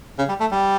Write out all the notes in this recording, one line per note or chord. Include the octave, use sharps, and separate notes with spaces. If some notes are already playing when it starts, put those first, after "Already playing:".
C#3
G3
A3
G3